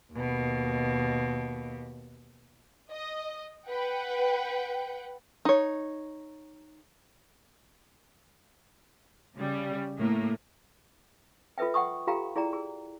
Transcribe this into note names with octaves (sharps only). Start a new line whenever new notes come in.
D#2 B2
D#5
B4 F#5 G5
D#4 C#5
C#3 G3
A2 A#3
F4 A4 B4 E5 G5
F#5 G5 C#6 D#6
F4 G4 A4 F5 G5 A#5
E4 G#4 D5 G5 A#5
G#4